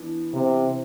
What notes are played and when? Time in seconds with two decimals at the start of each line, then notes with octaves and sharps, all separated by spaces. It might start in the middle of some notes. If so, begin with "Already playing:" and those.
Already playing: E3 B3 D4
0.33 C3